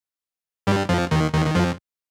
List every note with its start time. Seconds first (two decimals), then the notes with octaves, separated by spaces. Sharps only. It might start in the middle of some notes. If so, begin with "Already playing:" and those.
0.67 G2 G3
0.89 F2 F3
1.11 D#2 D#3
1.33 D#2 D#3
1.47 D#3
1.55 F2 F3